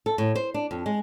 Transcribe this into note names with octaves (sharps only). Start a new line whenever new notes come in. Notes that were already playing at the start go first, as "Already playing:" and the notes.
A4
A2
C5
D4
F2
G#3